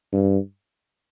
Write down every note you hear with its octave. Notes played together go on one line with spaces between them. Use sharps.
G2